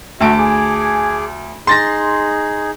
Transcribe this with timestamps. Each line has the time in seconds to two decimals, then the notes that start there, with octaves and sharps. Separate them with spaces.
0.21 D2 F#4 E5 A5 D7
0.38 G#4 G#5 D6
1.67 D#4 G#4 C6 A6 A#6